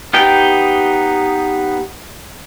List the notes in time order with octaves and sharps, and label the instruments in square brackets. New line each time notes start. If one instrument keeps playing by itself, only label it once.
[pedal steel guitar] B3 D#4 G4 G5